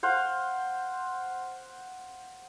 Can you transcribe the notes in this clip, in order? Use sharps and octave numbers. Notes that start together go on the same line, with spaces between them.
C5 F5 F#5